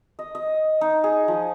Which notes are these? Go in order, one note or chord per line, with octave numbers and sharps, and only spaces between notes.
D#5
D#5
D#4
G#4
F3